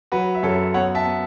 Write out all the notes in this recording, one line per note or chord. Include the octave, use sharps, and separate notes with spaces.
F#3 F#4 B4
E5
F#2 A4 C#5
B3 C#5 F#5
E5 A5
B3